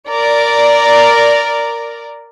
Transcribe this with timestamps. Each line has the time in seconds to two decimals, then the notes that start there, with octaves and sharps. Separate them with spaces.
0.10 A#4 D5